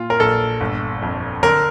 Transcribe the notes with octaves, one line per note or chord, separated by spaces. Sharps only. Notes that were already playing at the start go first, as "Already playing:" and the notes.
Already playing: A#2 F4
A#4
A#1 A4
G1
F2
D3 A#4